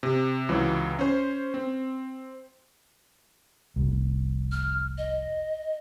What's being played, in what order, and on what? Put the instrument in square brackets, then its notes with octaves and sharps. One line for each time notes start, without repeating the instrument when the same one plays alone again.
[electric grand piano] C3
C#2 E3 F#3
C#4 C5
C4
[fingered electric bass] F1 C2
[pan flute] F6
D#5